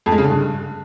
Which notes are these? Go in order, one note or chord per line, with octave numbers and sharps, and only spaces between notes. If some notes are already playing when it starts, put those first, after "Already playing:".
F2
G#3
C#3
D3
G2